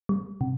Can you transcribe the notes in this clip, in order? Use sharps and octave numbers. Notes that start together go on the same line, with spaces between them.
G3
C3